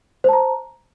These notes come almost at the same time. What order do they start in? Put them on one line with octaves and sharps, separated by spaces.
C5 A5 A#5